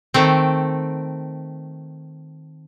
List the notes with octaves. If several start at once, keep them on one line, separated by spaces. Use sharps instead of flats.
D#3 A3 C4